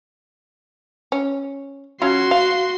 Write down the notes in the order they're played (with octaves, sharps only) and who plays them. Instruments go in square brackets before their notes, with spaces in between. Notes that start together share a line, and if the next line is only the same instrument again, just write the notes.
[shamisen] C#4
[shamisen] F#3 C#4 F4 [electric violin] F#4 C6
[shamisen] F5